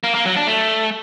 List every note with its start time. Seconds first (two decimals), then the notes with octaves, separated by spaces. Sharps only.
0.04 A#3
0.14 A#3
0.25 F#3
0.36 D4
0.47 A3